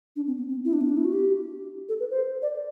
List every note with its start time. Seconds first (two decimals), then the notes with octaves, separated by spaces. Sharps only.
0.16 D4
0.27 C4
0.38 B3
0.49 C4
0.65 E4
0.73 D4
0.81 B3
0.89 D4
0.97 E4
1.05 F#4
1.13 G4
1.89 A4
2.00 B4
2.11 C5
2.42 D5